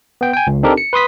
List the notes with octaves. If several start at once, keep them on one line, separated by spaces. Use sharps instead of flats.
B3 G5
G5 G#5
C#2
C4 D4 D#4 G4 A4 A#4
C#7
B4 C6 D#6 B6